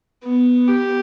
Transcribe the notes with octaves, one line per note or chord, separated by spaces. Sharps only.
B3
G4